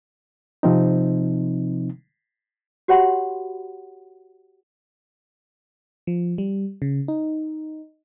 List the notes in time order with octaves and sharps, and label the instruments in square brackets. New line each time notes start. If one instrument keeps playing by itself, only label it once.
[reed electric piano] C3 F3 C4 D#4
[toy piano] F#4 G4 C#5 F#5 B5 C6
[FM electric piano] F3
G3
C#3
D#4